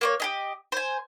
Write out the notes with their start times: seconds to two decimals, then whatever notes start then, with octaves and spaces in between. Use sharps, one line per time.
0.01 A#3 C5 C#5
0.20 G4 G#4 D#5
0.72 C5 G#5